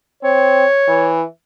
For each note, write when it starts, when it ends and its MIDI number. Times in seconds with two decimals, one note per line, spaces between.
0.23 0.64 60
0.23 1.16 73
0.88 1.22 52